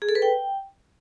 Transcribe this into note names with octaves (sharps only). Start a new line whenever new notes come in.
G#4
A4
B4
G5